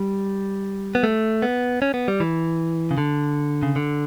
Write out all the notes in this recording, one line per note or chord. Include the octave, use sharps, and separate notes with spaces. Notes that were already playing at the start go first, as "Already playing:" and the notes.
Already playing: G3
B3
A3
B3
C#4
B3
G3
E3
C#3
D3
C#3
D3